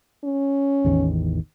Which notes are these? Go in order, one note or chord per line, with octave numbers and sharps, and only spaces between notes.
C#4
A1 E2 D#3